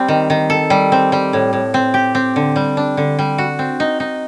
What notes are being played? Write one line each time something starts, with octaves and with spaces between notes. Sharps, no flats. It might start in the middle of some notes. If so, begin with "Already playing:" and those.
Already playing: G3 C4
D#3
D#3
A4
G3
C4
G3
A2
A2
C4
G4
C4
D3
G3
D4
D3
G3
F#4
C4
D#4
D#4